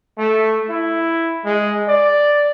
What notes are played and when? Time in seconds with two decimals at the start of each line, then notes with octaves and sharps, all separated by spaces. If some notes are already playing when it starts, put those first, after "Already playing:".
0.18 A3
0.69 E4
1.45 G#3
1.88 D5